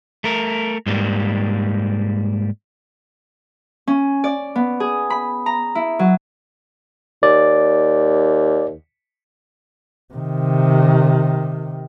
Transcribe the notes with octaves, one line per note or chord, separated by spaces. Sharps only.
A3 A#4
G#2 G3 A#3
C#4
D5
B3
G#4
B5
A#5
E4
F#3
D#2 D5
C3 D#3